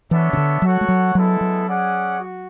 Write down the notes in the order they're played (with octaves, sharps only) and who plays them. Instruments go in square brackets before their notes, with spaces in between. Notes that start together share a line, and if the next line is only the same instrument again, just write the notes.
[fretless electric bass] E3 [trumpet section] B3 D4 A4 C#5 E5
[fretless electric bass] C#3
D3
[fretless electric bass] F#3 [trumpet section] F#4 A4 C#5 F#5
[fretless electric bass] G#3
F#3
[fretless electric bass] F#3 [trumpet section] G#3 B3 E4 A4
[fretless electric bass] F#3
[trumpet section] C#4 G#4 D5 F#5
F#4